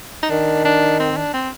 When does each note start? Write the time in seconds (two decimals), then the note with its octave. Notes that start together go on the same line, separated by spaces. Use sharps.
0.22 D#4
0.30 D#3 D4
0.65 D4
0.99 C4
1.17 D4
1.34 C4